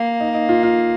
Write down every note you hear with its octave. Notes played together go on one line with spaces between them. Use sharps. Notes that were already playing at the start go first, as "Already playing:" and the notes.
Already playing: A#3
D#4
D#4
F4
F4